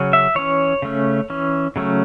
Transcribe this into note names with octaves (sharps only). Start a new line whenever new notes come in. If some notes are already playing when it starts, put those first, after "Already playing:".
Already playing: C#3 F#3 C#4
E5
E3 C#4 C#5
C#3 A3 C#4
E3 C#4
C#3 F#3 A3 C#4